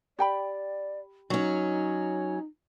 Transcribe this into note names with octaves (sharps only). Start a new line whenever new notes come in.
G4 D5 G5 B5
F#3 C#4 D#4